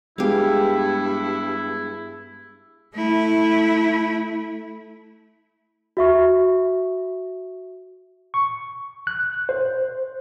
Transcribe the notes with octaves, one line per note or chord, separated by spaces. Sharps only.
G2 G#3 B3 E4 G4 G#4 F5
A3 E4
F#4 E5 C#6
C#6
F#6
C5